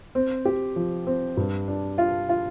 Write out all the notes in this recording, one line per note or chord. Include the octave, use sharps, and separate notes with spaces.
C4
G4
F3
C4
G2
D4
F4
F4